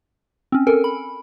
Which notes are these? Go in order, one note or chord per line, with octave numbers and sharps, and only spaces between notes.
C4 C#4
A4 A#4 G#5
B5